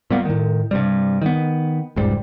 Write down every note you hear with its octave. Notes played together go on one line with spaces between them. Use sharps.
A#2 G3 A#3 B3
A2 D#3
G2 C3 G3
D#3 B3
F1 C#2 G#2 G3